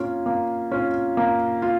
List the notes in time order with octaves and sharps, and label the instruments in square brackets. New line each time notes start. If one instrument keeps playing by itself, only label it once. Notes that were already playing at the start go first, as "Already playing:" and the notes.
Already playing: [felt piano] A#3 C#4 F4
A#3
C#4 F4
A#3
F4